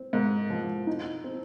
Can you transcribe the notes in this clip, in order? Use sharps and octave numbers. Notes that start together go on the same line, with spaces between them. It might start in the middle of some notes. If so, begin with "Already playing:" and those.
Already playing: C4
G#2 A#4
F3
D#4
C4